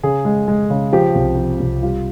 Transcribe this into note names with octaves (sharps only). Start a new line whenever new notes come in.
C#3 G#4
G#3
G#3
C#3
F3 G4
C2
F3
C2
G3 F4